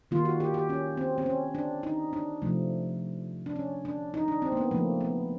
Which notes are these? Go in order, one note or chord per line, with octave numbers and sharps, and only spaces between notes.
D#3 G3 A#3 F4
F#4
G4
G4
C#4
C4
C4
C#4
D4
D#4
D4
C3 F3 A3
D4
C#4
D4
D#4
D4
C4
A#3
B3
C#3 F3 A3 A#3
B3